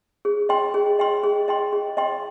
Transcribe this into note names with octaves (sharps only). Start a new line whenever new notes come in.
G#4
D#5 G5 C6
G#4
D#5 G5 C6
G#4
D#5 G5 C6
G#4
D#5 G5 C6